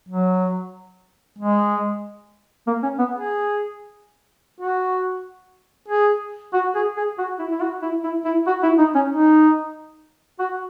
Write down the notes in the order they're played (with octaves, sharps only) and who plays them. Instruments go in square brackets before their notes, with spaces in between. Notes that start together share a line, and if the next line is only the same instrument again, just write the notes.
[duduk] F#3
G#3
A#3
C#4
B3
G#4
F#4
G#4
F#4
G#4
G#4
F#4
E4
E4
F#4
E4
E4
E4
F#4
E4
D#4
C#4
D#4
F#4